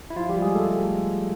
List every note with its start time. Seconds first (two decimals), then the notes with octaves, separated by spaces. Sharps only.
0.10 E4
0.16 F3 F4
0.29 G3 G4
0.41 G#3 G#4
0.54 A3 A4